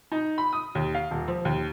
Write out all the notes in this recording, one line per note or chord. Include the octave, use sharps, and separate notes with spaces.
D#4
B5
D#6
D#2
F5
D#1
F3
D#2